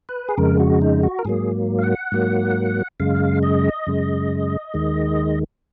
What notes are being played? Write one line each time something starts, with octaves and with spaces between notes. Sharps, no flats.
B4
G#4
F2 C#3 G#3 A#4
F#4
D#4
F#4
A#4
G#2 F#3 A#3 G#4
F5
F#5
G#2 F#3 A#3
F#2 C#3 G#3 F5
D#5
F#2 C#3 G#3
D#2 D#3 G#3